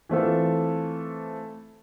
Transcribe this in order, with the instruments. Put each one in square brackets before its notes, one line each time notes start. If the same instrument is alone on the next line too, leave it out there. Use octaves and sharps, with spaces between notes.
[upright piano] E3 A3 C4 F4 A4